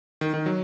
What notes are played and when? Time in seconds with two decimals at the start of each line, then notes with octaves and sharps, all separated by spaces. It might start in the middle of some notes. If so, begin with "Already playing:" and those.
0.21 D#3
0.34 D#3
0.46 F#3